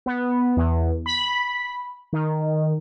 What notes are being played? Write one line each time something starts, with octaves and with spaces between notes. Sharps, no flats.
B3
E2
B5
D#3